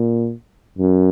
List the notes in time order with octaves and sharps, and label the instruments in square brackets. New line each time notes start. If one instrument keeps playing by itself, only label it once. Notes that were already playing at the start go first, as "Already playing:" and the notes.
Already playing: [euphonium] A#2
F#2